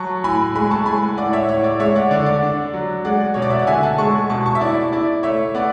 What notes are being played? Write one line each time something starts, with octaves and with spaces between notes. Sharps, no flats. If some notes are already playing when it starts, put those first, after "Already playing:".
Already playing: F#3 A5 C#6
A2 G#5 B5
G#3 G#5 B5
A5 C#6
G#3 G#5 B5
A2 D5 F#5
C#5 E5
A2 C#5
D5
G#3 C#5 E5
D5 F#5
D3 D5
D5
D4
F#3
G#3 D5 F#5
B2 C#5
D5
E5
F#5
D3 E5 G#5
F#5 A5
G#3 A5 C#6
B2 A5 C#6
A5 C#6
E5
E4 D5
E4 D5
A3 C#5 E5
B3 D5 F#5